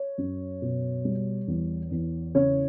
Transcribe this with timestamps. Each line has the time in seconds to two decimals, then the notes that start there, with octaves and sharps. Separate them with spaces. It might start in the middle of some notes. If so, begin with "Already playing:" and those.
Already playing: C#5
0.18 F#2
0.62 B2
1.05 G3
1.48 E2
1.91 E2
2.35 C#3 C#5